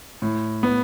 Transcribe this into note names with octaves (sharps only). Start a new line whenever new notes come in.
A2
B3